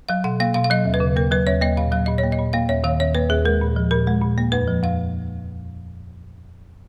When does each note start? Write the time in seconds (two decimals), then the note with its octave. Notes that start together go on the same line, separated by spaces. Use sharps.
0.09 F#3 F5
0.24 B2 F#5
0.40 A#3 F5
0.54 B2 F5
0.64 F5
0.70 F#3 D#5
0.85 D#2
0.94 B4
1.00 C#3
1.16 A#3 A#4
1.31 F#3 B4
1.47 D#2 C#5
1.61 A#3 D#5
1.77 A#2 F5
1.92 F#3 F5
2.06 A#2 D#5
2.18 C#5
2.23 A#3
2.32 D#5
2.39 A#2
2.53 A#3 F5
2.69 D#2 C#5
2.84 D#3 F5
3.00 D#2 C#5
3.15 A#3 B4
3.30 D#2 G#4
3.45 G#3 A#4
3.61 A#2
3.76 F3
3.91 A#2 A#4
4.07 G#3
4.21 A#2
4.38 A#3
4.52 F2 B4
4.68 F3
4.83 F2 F5